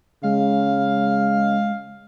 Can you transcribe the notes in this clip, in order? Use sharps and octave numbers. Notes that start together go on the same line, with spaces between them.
C#3 G#3 F5